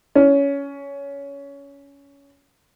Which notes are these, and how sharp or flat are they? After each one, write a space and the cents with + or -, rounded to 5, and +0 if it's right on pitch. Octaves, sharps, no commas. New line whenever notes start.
C#4 +15